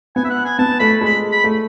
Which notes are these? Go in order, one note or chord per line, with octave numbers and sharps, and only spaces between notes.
B3 G#5
E5
F#5
G#5
B3 A5
A3 B5
G#3 B5
B5
A3